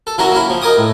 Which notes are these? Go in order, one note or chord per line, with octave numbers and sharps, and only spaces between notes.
A4
E3 F#3 C#4 F#4 A#4
A#3 C#4 E4
F3
D#4 A#4 G#5 D6 D#6
A2